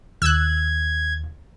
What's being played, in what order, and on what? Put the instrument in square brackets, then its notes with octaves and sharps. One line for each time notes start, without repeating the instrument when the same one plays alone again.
[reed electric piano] D#2 [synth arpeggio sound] E6 F#6 [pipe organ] G#6